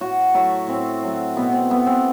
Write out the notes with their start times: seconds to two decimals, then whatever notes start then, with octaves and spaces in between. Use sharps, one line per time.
0.01 A2 F#4
0.34 F#3 A3 E4
0.68 A2 C4
1.02 F#3 A3
1.36 B2 B3
1.53 C4
1.70 A3 B3
1.87 C4